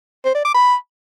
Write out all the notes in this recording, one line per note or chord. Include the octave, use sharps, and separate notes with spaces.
C5
D5
D6
B5